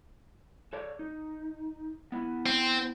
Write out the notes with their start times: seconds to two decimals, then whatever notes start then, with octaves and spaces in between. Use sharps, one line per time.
0.73 A4 C#5 D5
0.99 D#4
2.12 B3 E4 F#5
2.46 C4